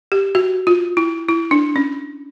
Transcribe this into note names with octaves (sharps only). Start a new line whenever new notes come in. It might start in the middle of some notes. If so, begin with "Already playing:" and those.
G4
F#4
F4
E4
E4
D4
C#4